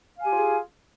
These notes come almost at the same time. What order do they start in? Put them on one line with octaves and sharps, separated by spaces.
F5 G#5 G4 F4 G#4